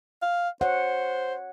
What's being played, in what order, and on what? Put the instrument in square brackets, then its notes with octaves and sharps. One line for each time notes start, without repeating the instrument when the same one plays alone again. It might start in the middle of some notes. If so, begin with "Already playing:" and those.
[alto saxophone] F5
[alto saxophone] C5 [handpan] C#5 F#5